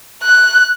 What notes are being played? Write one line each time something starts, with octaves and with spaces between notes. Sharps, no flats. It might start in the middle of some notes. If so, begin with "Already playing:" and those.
F#6